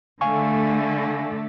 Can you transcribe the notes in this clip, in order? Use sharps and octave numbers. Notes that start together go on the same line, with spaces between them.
D3 A3 F5 G#5 C#6